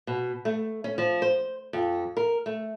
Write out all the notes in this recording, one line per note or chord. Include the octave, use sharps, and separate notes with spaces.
B2
A3
C#4
F3
C5
F2
A#4
A3